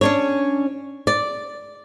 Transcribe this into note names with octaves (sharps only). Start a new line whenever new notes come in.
C#4 D4 C#5
D5